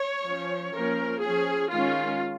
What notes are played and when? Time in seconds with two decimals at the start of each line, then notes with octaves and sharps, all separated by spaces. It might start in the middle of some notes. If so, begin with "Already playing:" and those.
Already playing: C#5
0.26 F3 C#4
0.73 F3 A#3 C#4 A#4
1.21 F3 C#4 G#4
1.70 D#3 G#3 C#4 F4